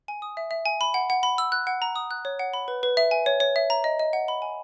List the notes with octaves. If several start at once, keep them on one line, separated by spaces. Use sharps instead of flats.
G#5
D#6
E5
E5
G#5
B5
F#5
F#5
B5
E6
F#6
F#5
A#5
D#6
F#6
C#5
F#5
B5
B4
B4
E5
G#5
C#5
C#5
E5
A#5
D#5
D#5
F#5
B5
G#5